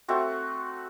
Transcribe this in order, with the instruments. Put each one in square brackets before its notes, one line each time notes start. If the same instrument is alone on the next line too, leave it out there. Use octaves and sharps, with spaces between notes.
[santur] A3 C4 F#4